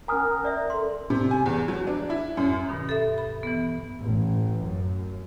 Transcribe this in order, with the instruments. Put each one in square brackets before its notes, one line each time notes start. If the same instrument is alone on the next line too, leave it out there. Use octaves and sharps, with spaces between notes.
[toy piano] C#4 G#5 [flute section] A#4 [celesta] A#5 D#6 F6
[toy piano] C#4 D5 E5
[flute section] A4 [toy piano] C6
[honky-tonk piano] C3
G#5
E2
F#3
D4
E4
F#2
[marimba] G2 B2 D#3
A4 E5
B5
E3 B3
[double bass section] A1
F#2